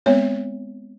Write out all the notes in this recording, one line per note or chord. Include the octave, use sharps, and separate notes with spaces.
G#3 B3 C4 C#5